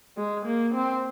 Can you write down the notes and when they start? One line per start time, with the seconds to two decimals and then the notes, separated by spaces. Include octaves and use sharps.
0.17 G#3
0.46 A#3
0.74 C4